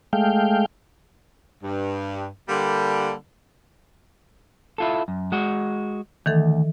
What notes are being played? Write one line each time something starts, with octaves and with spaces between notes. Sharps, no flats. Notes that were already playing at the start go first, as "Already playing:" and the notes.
G#3 A3 F5 G5
G2
D3 G3 A#3
E4 F4 A4
F#2
G#3 F#4
D2 D#3 E3 A4